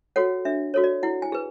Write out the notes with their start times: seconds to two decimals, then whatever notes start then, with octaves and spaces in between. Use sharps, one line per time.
0.16 F#4 A4 C#5 F#5
0.45 D4 E5
0.74 F#4 A4 C#5
0.84 D5
1.03 E4 F#5
1.22 G#5
1.32 G#4 B4